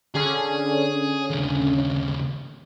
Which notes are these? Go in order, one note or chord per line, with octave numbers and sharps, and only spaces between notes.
D3 C#4 G#4
D#2 C#3